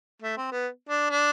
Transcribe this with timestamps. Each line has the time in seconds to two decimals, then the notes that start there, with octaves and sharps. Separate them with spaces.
0.23 A3
0.37 C4
0.52 B3
0.89 D4
1.11 D4